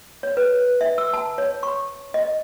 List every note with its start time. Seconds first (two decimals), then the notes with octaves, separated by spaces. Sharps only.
0.23 C#5
0.37 B4
0.81 E5
0.98 E6
1.13 A5
1.38 C#5
1.63 C#6
2.14 D#5